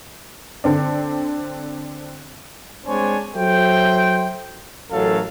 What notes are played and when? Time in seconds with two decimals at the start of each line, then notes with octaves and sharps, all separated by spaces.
0.64 D3 C4 D4
2.87 G#3 C4 D4 C5 C#5 G#5
3.36 F#3 A4 C5 E5 G5
4.92 A1 F#2 F#3 A4 F5